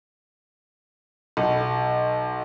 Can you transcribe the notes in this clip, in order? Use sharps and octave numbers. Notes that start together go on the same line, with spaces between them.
B1